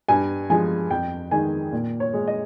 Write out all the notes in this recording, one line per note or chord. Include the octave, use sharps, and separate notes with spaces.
G2 G#5
F3 G#3 G#5
F2 G5
D#3 G#3 G#5
A#2
C#5
G#3
D#5